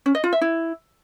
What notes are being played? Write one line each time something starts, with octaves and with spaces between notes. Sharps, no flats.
C#4
D#5
F4
E5
E4